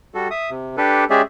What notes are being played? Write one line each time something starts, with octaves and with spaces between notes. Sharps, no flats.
G3 F#4 A4
E5 D#6
C3
D4 G4 A4 B4
G#3 C#4 G4 G#4 D5 E5